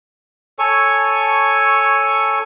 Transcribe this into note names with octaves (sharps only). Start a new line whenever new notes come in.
A4 C#5 G#5 C#6